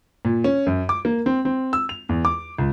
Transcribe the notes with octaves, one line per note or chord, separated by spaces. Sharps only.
A#2
C#4
F#2
D6
A#3
C4
C4
E6
F7
E2
D6
C#2